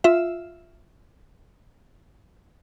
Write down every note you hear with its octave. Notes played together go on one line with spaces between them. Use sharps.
F4 E5